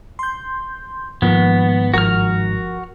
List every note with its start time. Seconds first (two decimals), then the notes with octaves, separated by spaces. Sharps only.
0.19 C6 G6
1.22 G#2 D#3 F3 A#3 B3
1.94 G1 F3 F#4 A#4 F6